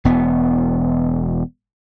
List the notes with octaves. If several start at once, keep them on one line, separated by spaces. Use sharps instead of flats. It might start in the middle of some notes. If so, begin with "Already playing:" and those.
E1 B3